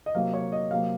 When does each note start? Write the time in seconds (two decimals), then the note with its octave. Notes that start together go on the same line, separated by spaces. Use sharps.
0.06 D#5
0.14 C3 F#3 A#3 F5
0.34 C#5
0.52 D#5
0.71 C3 F#3 A#3 F5